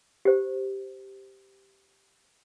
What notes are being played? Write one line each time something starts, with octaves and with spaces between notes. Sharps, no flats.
G4 C5